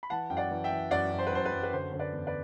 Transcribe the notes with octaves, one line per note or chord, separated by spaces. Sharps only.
B5
E3 F#5 A5
F#2 G5
D5 F#5
E3
E5 G5
E3
F#2 D5 F#5
F#2
C5
B4
F#2 C5
B4
F#2
B4
D3 C5
D3 C5
B4 D5
E2
B4 D5